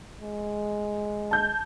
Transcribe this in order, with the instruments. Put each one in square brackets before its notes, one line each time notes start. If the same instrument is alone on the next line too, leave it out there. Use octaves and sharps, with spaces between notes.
[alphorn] G#3
[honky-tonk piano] A5 G6